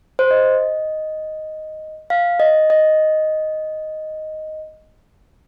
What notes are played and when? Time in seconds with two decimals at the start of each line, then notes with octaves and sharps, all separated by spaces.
0.19 C5
0.31 D#5
2.10 F5
2.40 D#5
2.70 D#5